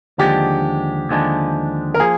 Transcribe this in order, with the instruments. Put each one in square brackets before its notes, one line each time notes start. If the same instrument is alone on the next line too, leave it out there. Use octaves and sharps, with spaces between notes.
[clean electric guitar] D#2 D3 F3 G#3 D4 [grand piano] G4
[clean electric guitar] D#2 D3 F3 G#3 D4
[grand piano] A#4
[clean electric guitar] F3 A#3 [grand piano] G#4